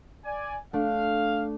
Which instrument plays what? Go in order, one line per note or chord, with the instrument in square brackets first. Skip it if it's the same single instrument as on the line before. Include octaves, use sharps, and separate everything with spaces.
[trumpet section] D5 G#5
[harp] A3 D4 [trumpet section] F5